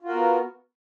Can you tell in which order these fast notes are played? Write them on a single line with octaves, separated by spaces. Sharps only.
F4 F#4 A#4 B3